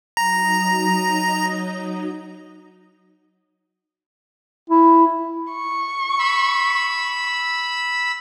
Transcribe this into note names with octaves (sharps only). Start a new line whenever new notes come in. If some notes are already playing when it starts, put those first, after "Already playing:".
F#3 D#4 D#5 A#5
E4
C#6
B5 E6